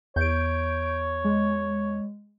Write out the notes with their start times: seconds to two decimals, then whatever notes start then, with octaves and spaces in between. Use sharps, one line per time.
0.16 E2 C#5 G6 D7
1.24 G#3